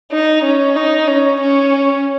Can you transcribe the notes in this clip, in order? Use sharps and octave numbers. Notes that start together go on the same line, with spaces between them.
D#4
C#4
D#4
C#4
C#4